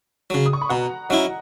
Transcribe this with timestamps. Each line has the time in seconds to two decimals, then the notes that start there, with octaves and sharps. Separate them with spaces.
0.30 C#3 F#3
0.46 D#6
0.53 C#6
0.61 B5
0.69 B2 F#5 A#5
1.09 F#3 C#4 E4 D#5 F#5